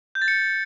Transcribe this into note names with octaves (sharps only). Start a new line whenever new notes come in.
G6
A6
C#7